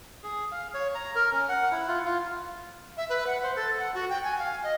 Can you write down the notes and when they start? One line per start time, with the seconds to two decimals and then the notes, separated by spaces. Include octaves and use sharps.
0.23 G#4
0.52 F5
0.74 C#5
0.95 A#5
1.15 A#4
1.32 C#4
1.49 F#5
1.72 E4
1.88 F4
2.05 F4
2.97 E5
3.09 B4
3.27 F#5
3.43 C5
3.56 A4
3.79 F#5
3.95 F#4
4.09 G5
4.24 G#5
4.39 F5
4.64 D#5